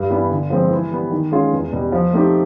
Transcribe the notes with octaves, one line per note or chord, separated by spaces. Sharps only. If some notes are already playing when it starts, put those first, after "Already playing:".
Already playing: G2
E3 G3 B3 D4
D3
F3 G#3 C4
E3
G3 B3
D#3
G#3 C#4 F4 G#4
E2
B2 G3
F3
A3 C4 D#4 G4